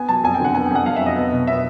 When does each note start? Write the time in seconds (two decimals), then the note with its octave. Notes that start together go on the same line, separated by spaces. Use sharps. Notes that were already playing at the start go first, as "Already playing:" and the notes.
Already playing: B3 G#5
0.09 F#3 A5
0.23 F2 G#5
0.34 G5
0.40 D3 F#5
0.55 B3 G#5
0.65 G5
0.71 F2 F#5
0.86 F2 F5
0.96 F#3 E5
1.06 D#5
1.16 B3
1.31 B2
1.47 B3 E5